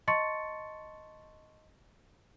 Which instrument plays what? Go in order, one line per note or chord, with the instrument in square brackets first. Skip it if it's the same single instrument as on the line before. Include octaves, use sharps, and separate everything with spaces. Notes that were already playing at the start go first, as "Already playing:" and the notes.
[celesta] D#5 A5 C6 C#6 A6 C#7